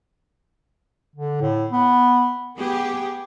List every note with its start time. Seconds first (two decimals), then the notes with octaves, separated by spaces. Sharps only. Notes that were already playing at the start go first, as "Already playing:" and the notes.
1.15 D3
1.41 A2
1.72 B3
2.57 B3 G4 G#4